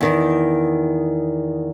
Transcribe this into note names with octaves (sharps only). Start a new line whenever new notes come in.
E2 D#3